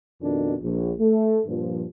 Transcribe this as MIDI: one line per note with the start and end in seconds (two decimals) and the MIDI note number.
0.21 0.54 41
0.21 0.54 47
0.21 0.54 51
0.21 0.54 62
0.61 0.92 34
0.99 1.39 57
1.46 1.84 43
1.46 1.84 46
1.46 1.84 53